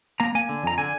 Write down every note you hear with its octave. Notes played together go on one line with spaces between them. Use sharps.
A#3 A#5
A#3 G#5
D3
F2 A#5
D3 G#5